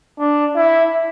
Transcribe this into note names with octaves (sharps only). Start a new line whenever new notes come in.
D4
E4